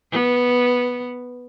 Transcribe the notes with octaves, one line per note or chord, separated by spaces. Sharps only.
B3